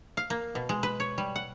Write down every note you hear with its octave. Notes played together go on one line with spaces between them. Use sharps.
F5
A#3
B2
G#3
B4
C#5
G3
F#5